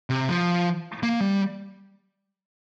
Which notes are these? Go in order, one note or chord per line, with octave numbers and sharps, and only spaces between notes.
C3
F3
A#3
G3